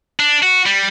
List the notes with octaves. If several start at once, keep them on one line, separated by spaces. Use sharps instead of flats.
D4
F#4
G3